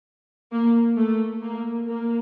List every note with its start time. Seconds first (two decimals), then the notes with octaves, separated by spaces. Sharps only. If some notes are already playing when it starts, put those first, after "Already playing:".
0.52 A#3
0.97 A3
1.42 A#3
1.87 A#3